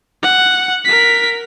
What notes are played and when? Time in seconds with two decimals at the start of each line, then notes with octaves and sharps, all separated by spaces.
0.23 F#5
0.85 A#4 B6